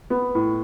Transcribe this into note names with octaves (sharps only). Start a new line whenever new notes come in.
B3
A2